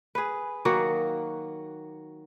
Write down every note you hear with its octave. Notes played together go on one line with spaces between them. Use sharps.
G#4 B4
D#3 F#3 A#3 F#4